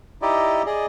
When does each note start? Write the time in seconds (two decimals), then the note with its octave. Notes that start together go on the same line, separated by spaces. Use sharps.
0.22 D#4 E4 G4 D5 D#5
0.66 G#4 D5 D#5